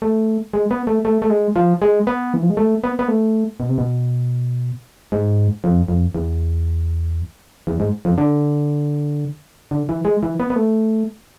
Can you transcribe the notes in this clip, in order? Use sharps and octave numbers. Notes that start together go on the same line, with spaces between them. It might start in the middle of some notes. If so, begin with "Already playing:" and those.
A3
G#3
B3
A3
A3
A3
G#3
F3
G#3
B3
E3
F3
G#3
A3
B3
B3
A3
B2
C3
B2
G#2
F2
F2
E2
E2
G#2
F2
D3
D3
E3
G#3
E3
B3
B3
A3